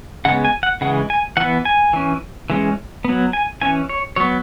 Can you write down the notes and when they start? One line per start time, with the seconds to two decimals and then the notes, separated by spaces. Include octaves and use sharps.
0.25 C#3 G#3 B3 F#5
0.45 G#5
0.63 F#5
0.81 C#3 E3 G#3 F#5
1.10 G#5
1.37 E3 B3 F#5
1.65 G#5
1.93 E3 C#4
2.50 E3 G#3 C#4
3.05 F#3 B3
3.33 G#5
3.61 E3 C#4 G#5
3.89 C#5
4.16 F#3 B3 C#5